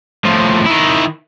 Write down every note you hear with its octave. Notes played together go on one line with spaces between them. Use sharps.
A2 F3
D#3 E4